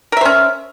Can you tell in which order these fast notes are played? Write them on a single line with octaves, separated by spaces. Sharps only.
A#4 E5 C5 C#4